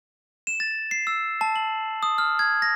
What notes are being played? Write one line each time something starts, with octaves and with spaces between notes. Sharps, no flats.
E7
A6
C7
E6
A5
F#7
D#6
F6
G#6
A#6